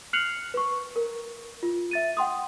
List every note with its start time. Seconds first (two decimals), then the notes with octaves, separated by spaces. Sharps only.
0.13 F6 F#6 C7 C#7 F7 F#7
0.54 B4 C#6
0.96 A#4
1.63 F4
1.91 E5 A6 D#7
2.17 F#5 G5 C6 D#6